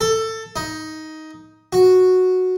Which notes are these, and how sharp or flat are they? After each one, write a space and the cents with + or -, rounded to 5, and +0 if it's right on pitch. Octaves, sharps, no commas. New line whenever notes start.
A4 +15
D#4 +10
F#4 -5